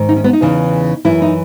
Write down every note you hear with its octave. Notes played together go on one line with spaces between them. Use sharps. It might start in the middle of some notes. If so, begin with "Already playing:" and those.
Already playing: G#2 D#3
D#4
C#4
B3
D#4
E2 C#3 E3
F#2 E3 E4
D#4